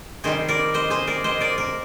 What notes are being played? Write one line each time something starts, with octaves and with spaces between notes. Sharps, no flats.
C3 D#3 G3 G#4 C5
A#4 D5
C5 D#5
G#4 C5
A#4 D5
C5 D#5
A#4 D5
A#4 D5